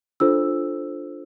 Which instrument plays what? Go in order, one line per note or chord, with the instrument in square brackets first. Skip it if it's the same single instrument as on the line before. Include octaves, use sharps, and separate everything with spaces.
[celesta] D4 F4 A4 C5 E6